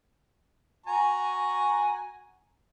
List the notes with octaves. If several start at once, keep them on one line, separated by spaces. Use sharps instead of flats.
F#4 G#5 A#5 C#6